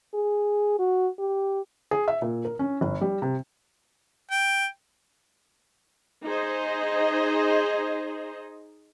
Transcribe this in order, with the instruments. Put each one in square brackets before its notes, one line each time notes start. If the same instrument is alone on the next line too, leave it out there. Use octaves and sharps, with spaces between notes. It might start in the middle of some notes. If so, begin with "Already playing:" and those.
[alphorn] G#4
F#4
G4
[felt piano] G#4
E5
A#2
A#4
C#4
G1
G3
C3
[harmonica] G5
[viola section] D#4 G#4 C5 D#5